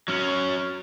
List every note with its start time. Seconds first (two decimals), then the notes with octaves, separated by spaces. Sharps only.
0.08 F#3 C#4